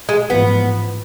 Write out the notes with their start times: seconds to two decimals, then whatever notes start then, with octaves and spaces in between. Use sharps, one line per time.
0.09 G#3
0.30 A1 G#2 F3 B3